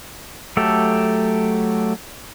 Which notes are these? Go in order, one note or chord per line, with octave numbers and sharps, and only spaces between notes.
F#3 A3 G4 A4